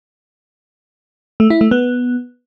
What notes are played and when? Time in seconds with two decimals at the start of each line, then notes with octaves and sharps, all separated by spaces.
1.40 A3
1.50 E4
1.61 A3
1.71 B3